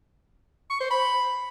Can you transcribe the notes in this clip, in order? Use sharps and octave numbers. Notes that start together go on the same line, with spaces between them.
C#6
C5
B5